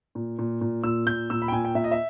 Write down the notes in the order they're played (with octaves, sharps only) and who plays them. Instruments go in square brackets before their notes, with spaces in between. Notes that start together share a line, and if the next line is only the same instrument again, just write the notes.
[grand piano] A#2
A#2
A#2
A#2 E6
A#2 G6
A#2 E6
B5
G5
A#2 G#5
G5
A#2 E5
D#5
E5